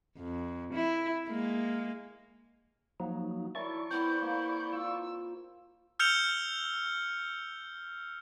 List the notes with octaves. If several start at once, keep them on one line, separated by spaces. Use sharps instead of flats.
F2
E4
G#3 A#3
F3 F#3 A#3 D#4
E4 A#4 C#5 D5 A5 C#6
B3 C4 E4 G6
A#3
F4 E6
E6 F6 G6 C#7 F7 G7